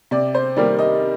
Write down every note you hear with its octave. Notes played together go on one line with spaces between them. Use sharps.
C3 D5
C5
D#3 G3 A#3 D5
D#5